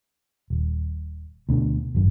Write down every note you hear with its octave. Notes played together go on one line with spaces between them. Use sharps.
D#1
D2 B2 D3
G#1 F#2